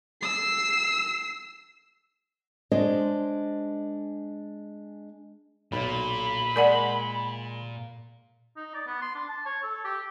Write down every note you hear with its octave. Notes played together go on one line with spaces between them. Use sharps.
E6 C7
G#3 D4 C5 C#5 D#5
B1 A#2 B5
G#3 A#4 D5 F#5
D#4
D5
B3
C6
D4
A5
C#5
A4
G4